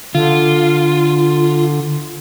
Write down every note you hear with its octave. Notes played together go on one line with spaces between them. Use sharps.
D3 F4